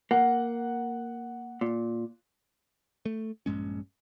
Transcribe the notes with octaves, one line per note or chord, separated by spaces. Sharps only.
A#3 F#5
A#2
A3
A#1 G2 G#3 C#4